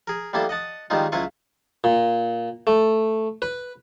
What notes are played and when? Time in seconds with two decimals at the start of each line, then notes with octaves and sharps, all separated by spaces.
0.07 G#4 A#4
0.33 G3 A#3 B3 E4 A4
0.49 D#5 F#5 A5 D#6
0.90 D#3 G3 G#3 B3 D#4 F4
1.12 C#2 F#3 E4 F4 B4 C#6
1.84 A#2
2.67 A3
3.42 B4